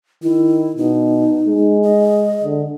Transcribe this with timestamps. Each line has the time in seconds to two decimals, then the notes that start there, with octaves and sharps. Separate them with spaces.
0.23 D#3 E4
0.77 B2 D#4
1.48 G#3
1.83 D#5
2.44 D3